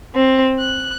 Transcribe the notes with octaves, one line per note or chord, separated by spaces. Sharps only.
C4
F#6